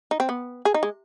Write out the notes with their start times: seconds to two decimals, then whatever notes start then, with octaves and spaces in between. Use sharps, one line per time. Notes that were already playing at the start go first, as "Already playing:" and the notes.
0.11 D#4
0.20 C4
0.29 B3
0.65 G#4
0.74 D#4
0.83 G#3